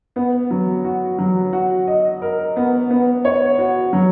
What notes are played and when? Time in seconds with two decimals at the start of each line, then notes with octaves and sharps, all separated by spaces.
0.16 B3
0.51 F#3
0.84 F#4
1.18 F#3
1.53 F#4
1.87 D#5
2.22 A#4
2.56 B3
2.90 B3
3.25 C#5
3.59 F#4
3.93 F#3